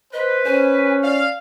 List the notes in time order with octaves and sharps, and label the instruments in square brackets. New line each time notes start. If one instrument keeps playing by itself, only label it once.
[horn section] B4 [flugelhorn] C5 [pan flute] D#5
[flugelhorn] C#4 [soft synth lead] C5 [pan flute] G#5
[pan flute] D5 [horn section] F5